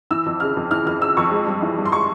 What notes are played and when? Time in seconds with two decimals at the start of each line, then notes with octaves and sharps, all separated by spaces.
0.11 E3 E6
0.26 F2
0.40 C#3 F6
0.56 F2
0.71 E3 F6
0.86 F2 F6
1.01 C#3 E6
1.17 F2 C#6
1.31 G#3
1.47 G2
1.62 E3
1.78 G2
1.85 C6
1.92 G#3 C#6